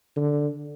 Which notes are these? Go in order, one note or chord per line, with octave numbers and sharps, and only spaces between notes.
D3